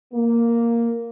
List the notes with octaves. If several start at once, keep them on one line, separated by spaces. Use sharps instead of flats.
A#3